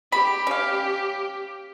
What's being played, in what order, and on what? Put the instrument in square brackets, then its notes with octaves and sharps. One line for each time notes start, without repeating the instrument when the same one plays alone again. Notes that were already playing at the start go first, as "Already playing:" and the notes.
[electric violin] G4 [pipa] B5
[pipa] C#4 F5